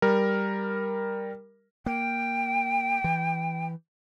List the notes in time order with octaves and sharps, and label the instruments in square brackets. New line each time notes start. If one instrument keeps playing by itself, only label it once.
[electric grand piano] G3 A#4
[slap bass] A#3 [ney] G5
[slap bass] E3